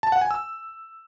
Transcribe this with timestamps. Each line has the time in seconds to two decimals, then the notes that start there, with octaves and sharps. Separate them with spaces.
0.03 A5
0.12 F#5
0.21 G#5
0.31 E6